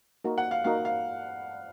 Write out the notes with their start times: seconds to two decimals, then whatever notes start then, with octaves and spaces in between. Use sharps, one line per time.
0.24 A#3 D#4 F#4 A#4
0.38 F#5
0.51 F5
0.64 A#3 D#4 F#4 A#4 F5
0.85 F5